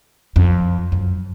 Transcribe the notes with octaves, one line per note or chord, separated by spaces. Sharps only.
F2
F#2